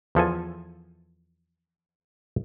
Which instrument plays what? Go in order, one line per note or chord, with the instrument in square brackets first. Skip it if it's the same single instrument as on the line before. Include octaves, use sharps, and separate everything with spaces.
[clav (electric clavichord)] E2 F3 A4 G#5